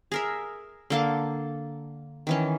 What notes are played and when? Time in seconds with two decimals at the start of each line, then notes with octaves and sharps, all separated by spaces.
0.12 G#4 A#4 E5
0.90 D3 A#3 A4 A5
2.27 D#3 E3 C#4